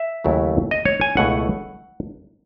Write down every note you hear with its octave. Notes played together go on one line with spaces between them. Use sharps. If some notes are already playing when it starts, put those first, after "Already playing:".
Already playing: E5
D#2 C#3 F#3 A3 E4
D#5
C#5
G#5
C#2 B2 A3 E4 F#5